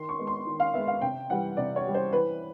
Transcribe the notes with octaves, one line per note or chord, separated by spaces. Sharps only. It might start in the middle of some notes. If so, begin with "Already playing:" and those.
Already playing: D#3 C6
C#6
G#3 B3
C6
D#3
F5
G#3 B3 E5
F5
C3 G5
E3 G3 F#5
C3 D5
C#5
E3 G3
C5
E3 B4